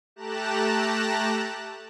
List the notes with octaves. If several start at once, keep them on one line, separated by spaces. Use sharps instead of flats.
A3 G4 A5 A#5 F#6 E7